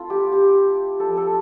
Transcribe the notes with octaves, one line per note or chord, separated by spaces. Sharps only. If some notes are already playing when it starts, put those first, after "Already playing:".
Already playing: A3 C4 E4 F4
G4
G4
F3 C4 E4 A4
A4